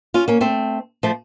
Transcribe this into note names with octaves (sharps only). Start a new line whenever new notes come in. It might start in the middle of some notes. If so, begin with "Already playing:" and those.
C#4 F4
A#3 C#4
A3 C4
F3 A3